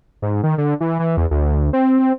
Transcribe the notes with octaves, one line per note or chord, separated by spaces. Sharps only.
G#2
D#3
D3
E3
E3
E2
D2
C4
C4